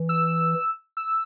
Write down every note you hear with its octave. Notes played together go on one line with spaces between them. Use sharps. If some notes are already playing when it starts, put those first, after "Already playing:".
Already playing: E3
E6
E6